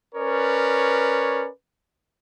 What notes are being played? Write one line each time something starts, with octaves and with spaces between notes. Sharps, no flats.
C#4 A#4 B4 C#5 D5